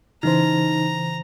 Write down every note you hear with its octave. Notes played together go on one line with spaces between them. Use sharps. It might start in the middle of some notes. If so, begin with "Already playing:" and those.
C#3 E3 D#4 C5 A#5